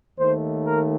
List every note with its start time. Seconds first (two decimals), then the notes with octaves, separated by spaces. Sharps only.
0.18 D#2 D#3 A3 C5
0.65 A#4